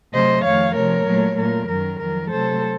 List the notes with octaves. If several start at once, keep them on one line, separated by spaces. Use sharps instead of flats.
C3 F#3 A3 C5 D#5
F2 D#3 A3 C#5 F5
C3 F3 A3 A#4 C#5
A#2 F#3 A3
A#2 F#3 A3 A#4
F#2 D#3 F#3 A#4
F2 D#3 F#3 A#4
C3 F#3 A3 A4 C5